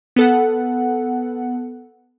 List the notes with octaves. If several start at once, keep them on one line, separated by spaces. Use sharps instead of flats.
B3 A4 F#5